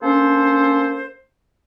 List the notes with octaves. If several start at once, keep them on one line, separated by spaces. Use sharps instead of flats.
A#3 C#4 D4 A4 C5